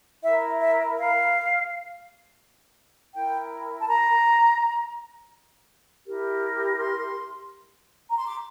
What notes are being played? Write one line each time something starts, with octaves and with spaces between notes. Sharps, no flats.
E4 A#4 E5
E5
F5
E4 A#4 G5
A5
A#5
E4 G4 A#4
C6
A#5
C6
D6